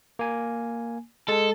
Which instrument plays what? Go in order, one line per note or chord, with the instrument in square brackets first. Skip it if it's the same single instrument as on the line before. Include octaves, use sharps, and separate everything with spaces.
[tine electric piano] A#3 G#5
[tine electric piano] G#3 [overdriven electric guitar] A4